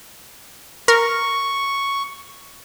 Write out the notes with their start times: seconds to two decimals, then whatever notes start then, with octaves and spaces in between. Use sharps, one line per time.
0.88 A#4 C#6